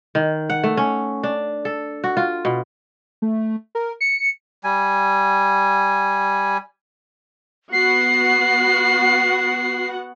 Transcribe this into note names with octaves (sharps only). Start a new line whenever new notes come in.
D#3
F#5
A3
C#4
D4
A4
F#4
F4
B2
A3
A#4
C#7
G3 G#5
B3 F#4 F#5 C7